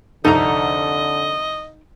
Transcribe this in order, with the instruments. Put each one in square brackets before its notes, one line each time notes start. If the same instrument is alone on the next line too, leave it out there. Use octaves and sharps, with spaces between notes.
[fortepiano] C2 F2 A4 [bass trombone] D3 [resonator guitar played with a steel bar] D#4 A#5 [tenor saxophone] D#5